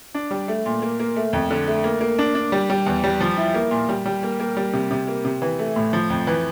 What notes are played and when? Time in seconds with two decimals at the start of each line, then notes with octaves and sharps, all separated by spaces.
0.15 D4
0.31 G3
0.48 A3
0.66 A#2
0.82 A#3
1.00 A#3
1.16 A3
1.33 F2
1.50 D3
1.68 A3
1.84 A#3
2.01 A#3
2.19 D4
2.35 D4
2.52 G3
2.70 G3
2.86 E2
3.04 G3
3.21 F3
3.37 E4
3.54 A#3
3.71 A#2
3.89 G3
4.06 G3
4.23 A#3
4.40 A#3
4.57 G3
4.73 C3
4.91 C3
5.07 A#3
5.25 C3
5.42 E3
5.59 A3
5.76 A2
5.93 F3
6.10 F2
6.27 E3